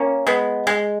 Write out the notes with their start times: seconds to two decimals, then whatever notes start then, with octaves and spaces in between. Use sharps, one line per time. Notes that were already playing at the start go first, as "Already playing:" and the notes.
Already playing: A#3 C#4
0.27 G#3 B3
0.67 G#3